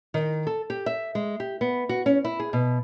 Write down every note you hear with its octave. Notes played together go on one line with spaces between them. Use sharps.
D#3
A4
G4
E5
G#3
G4
B3
F#4
C#4
E4
G#4
B2